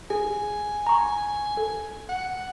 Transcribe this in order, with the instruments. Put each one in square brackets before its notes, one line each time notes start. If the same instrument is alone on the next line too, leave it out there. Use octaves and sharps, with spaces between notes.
[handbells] G#4 [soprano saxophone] G#5
[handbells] A#5 C#6
A4
[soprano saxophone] F#5